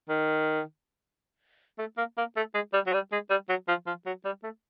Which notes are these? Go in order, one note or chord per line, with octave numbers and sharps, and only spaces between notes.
D#3
A3
A#3
A#3
A3
G#3
G3
F#3
G3
G#3
G3
F#3
F3
F3
F#3
G3
A3